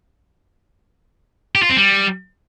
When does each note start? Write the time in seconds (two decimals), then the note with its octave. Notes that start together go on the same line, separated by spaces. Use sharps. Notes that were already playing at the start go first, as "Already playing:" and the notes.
1.55 G4
1.62 F4
1.70 C4
1.77 G3